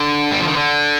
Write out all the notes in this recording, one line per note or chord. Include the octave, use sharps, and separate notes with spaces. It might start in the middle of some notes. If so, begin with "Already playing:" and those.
Already playing: D3
G3
F3
D#3
D3